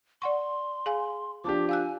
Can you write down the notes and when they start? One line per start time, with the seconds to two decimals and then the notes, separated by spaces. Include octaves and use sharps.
0.22 D5 F#5 C6 C#6
0.86 G#4 F5 G#5
1.44 F3 D4 G4 D6
1.69 F5 G#5 E6 F#6